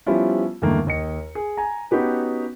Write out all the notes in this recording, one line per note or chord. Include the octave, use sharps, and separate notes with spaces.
F3 G3 B3 C#4 E4 F4
E2 G2 D3 D#3 A3 A#3
D#2 D#5 C#7
G#4
G#5 A#5
B3 C#4 D#4 F#4 G4 B4